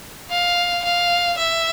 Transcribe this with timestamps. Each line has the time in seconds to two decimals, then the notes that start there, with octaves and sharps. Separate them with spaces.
0.31 F5
0.84 F5
1.38 E5